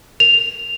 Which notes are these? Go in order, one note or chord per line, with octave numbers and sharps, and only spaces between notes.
F7